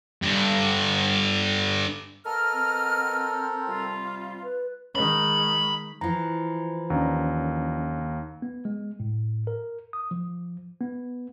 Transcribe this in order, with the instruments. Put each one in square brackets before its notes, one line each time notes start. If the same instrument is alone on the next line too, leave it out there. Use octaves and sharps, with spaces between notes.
[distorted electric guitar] G2 D3
[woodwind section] B3 D#5 F6 [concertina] A4 A#4
[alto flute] C4
[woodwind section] C3 G3 F4
[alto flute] B4
[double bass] D#3 G#3 [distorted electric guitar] B5
[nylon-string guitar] E3 F3 [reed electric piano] A#5
[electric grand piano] D#2 A#5 [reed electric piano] A#3 C#4 D4
[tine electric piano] B3
G#3
A2
A#4
D#6
F3
B3